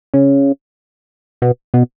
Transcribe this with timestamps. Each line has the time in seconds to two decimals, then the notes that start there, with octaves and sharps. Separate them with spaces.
0.14 C#3
1.42 B2
1.74 B2